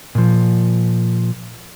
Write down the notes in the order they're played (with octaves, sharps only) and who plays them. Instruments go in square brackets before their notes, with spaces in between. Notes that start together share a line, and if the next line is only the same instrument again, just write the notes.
[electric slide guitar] A#2 F3